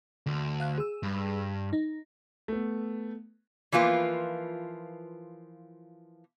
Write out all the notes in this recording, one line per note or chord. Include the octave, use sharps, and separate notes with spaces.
D2
F5 F#6
G#4 E6
G2
D#4
A3 B3
E3 F3 A#3 F4 B4